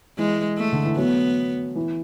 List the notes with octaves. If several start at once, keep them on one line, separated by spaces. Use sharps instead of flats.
E3 G#3
A3
D3
E3
F#3 B3
E3